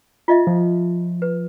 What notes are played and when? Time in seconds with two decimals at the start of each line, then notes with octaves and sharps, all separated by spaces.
0.28 F4 D#5 E5
0.47 F3
1.22 B4